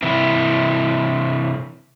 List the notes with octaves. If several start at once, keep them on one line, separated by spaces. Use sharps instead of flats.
C3 E3 E4